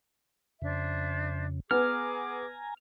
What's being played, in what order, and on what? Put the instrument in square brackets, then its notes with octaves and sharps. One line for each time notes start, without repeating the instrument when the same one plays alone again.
[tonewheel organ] F2 C#3 [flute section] D4 C5 E5
[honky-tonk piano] B3 [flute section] G#4 D6 [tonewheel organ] G#5 A#5 [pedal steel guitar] F6